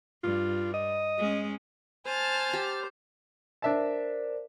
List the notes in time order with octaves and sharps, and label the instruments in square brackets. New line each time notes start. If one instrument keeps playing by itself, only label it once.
[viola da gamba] G2 [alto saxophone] F4
[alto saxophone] D#5
[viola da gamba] G#3 C#4
[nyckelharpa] C5 [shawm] G#5 [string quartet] A5 F6 A6
[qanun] G4
[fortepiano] D4 E5 A5 [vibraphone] A#4 C5 D5